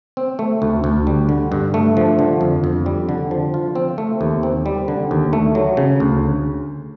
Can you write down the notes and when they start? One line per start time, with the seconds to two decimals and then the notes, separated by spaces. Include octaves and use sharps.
0.17 C4
0.39 A3
0.62 D2
0.84 D2
1.07 G3
1.29 D3
1.52 G2
1.74 A3
1.97 F3
2.19 D3
2.41 F2
2.64 F2
2.86 G3
3.09 D3
3.31 F3
3.54 F4
3.75 C4
3.98 A3
4.21 D#2
4.43 C4
4.66 G3
4.88 D3
5.11 D#2
5.33 A3
5.55 F#3
5.77 C#3
6.00 D2